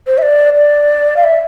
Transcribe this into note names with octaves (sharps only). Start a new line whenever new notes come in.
C5
E5
D5
D5
F5
E5